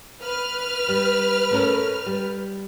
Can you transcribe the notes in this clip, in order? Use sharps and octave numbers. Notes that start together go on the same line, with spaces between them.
B4 F6
G3
A3 C#4 A#4
G3